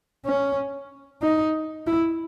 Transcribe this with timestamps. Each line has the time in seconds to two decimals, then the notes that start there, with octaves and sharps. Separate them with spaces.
0.26 C#4
1.22 D#4
1.86 E4